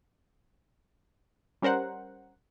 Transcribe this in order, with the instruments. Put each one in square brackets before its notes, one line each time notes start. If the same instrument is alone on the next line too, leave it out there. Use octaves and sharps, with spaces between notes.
[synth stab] G3 C#4 A#4 C5 F#5